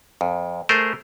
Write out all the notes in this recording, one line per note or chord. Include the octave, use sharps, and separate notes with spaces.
F2
A3 G#4 A#4 C5